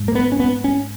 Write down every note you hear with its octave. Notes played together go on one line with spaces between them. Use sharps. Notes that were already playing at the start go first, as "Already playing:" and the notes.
Already playing: G#2
A#3
B3
C#4
B3
C#4